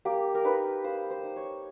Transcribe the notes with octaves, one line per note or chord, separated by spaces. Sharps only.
A#3 G4
A#4
D#4 B4
A#3 C5
C5
D#4
C#5